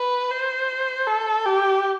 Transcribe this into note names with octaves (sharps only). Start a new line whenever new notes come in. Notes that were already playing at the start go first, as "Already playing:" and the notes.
Already playing: B4
C5
A4
G4